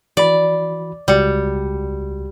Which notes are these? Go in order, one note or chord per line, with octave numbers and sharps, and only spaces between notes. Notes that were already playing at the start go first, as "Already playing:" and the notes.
E3 F#4 D5 B5
C#2 G3 F#4 C#7